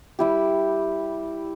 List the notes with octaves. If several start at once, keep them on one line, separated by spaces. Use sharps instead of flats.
G3 E4 G4